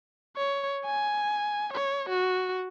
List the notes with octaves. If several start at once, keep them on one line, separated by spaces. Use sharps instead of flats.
C#5
G#5
C#5
F#4